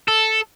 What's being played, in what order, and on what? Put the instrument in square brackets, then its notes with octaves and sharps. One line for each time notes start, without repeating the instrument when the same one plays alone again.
[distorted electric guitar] A4